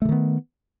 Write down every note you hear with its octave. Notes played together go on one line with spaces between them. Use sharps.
D3 D#3 A3 B3